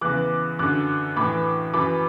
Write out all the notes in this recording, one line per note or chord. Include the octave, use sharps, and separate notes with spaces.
E2 C#3 E3 D6 F#6
F#2 D3 D6 F#6
A2 E3 B5 D6
F#2 E3 B5 D6